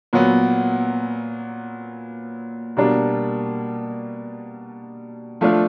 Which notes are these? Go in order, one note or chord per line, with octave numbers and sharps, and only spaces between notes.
A#2 F#3 B3
B2 G3 A#3 D4
F3 A3 D4 F4